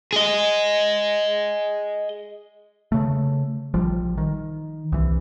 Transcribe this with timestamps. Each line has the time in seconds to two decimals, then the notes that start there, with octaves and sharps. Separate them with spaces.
0.13 G#4 D#5
2.92 C#3 A3
3.74 A#1 F3 G3
4.18 D#3
4.92 C2 E3